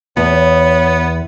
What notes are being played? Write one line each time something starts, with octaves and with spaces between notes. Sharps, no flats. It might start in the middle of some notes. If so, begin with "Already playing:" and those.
E2 B3 C#5